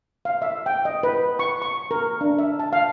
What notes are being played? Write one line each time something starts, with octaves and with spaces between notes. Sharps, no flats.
F5
E5
G5
D#5
B4
C#6
C#6
A#4
D4
E5
A5
F5